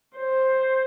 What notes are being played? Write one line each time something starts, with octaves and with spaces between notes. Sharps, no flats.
C5